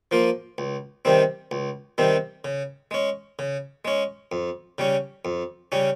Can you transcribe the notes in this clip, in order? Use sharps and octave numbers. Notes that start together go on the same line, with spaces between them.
F3 A#3 F4
C#2
C3 D#3 G3 C4
C#2
C3 D#3 G3 C4
C#3
G#3 C#4
C#3
G#3 C#4
F2
C#3 G3 C#4
F2
C#3 G3 C#4